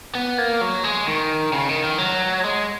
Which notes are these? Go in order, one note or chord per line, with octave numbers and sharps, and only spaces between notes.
B3
A#3
F#3
G#3
D#3
C#3
D#3
D#3
F#3
G#3